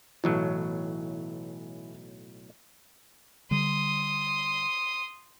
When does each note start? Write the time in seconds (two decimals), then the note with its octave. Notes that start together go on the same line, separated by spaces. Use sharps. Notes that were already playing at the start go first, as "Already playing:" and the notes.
0.24 B1 A2 E3 F#3
3.51 D3 G3 C6 D#6